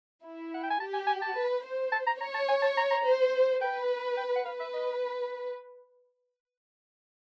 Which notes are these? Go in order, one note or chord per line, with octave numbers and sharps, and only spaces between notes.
E4
F#5
G5
G#5
G4 A5
G#5
G#5
A5
B4
C5
A5
A#5
C#5 A#5
A5
G#5
A5
A#5
A#5
C5
B4 G5
G5
F#5
B4 F5
E5
D#5